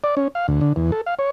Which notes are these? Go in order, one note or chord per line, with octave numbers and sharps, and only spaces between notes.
D5
C#4
F5
D2
D3
E2
A4
F5
C#5